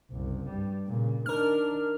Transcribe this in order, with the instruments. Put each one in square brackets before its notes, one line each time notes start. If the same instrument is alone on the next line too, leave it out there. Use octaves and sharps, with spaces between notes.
[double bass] F#1 C2
G2 G3
A#2 C#3
[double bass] D#3 D4 [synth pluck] A#4 F6